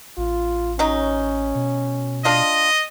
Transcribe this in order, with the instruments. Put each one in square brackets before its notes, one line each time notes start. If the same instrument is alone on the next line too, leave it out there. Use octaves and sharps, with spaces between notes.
[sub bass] A1 [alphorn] F4
[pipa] F#3 D#4 [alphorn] C#4
[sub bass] B2
[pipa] D4 F4 [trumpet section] D#5